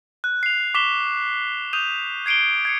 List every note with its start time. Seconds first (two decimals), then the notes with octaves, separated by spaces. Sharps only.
0.24 F#6
0.43 C7 F7
0.74 C#6 D6 B6 E7 G7
1.73 D#6 G6 D#7 F7
2.26 G#6 C7 D7 D#7 G7
2.65 G#6 C7 C#7